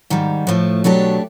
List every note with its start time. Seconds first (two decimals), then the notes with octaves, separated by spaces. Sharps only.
0.10 G#2 D#3 G3
0.47 A2 F3 A3
0.84 B2 F#3 A3 D4 G4